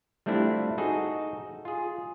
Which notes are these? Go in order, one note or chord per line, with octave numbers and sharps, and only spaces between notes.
G3 A3 C4 D4 E4 F4
D#4 F#4 G#4 A4
F4 G#4